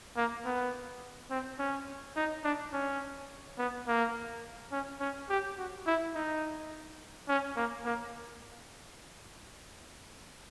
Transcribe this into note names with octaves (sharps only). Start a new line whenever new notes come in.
A#3
B3
C4
C#4
D#4
D4
C#4
B3
A#3
C#4
C#4
G4
F#4
E4
D#4
C#4
A#3
A#3